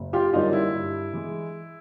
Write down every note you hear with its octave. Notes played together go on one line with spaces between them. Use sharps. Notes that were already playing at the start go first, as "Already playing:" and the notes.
Already playing: F#1
F4 G4
F#2 D3 G3 A#3 D#4 F4
E4
G2
E3 G#3